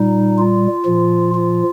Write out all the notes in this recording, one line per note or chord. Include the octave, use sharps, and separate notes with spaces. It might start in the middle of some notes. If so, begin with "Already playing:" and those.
Already playing: A#2 G3 D#4
F4
A#2 F3
F4